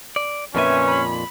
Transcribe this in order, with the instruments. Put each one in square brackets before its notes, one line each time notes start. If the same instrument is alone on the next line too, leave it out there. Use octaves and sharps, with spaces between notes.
[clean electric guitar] D5
[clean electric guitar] F2 A#2 G#5 [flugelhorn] C#4 [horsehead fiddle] B4 E5
[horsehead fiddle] B5